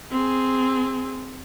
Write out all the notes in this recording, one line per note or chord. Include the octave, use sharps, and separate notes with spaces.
C4 G#4